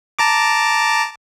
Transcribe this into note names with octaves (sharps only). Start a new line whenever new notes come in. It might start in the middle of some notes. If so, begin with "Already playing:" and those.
A5 A#5 D6